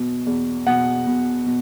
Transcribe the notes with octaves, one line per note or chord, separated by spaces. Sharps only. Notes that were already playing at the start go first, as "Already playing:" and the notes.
Already playing: B2
E2
B2 F#5
B2
B2